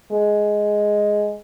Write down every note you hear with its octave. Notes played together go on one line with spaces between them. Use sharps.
G#3